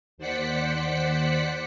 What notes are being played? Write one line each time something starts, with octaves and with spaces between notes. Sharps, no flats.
D#2 C5 D5 F#5 B6 C#7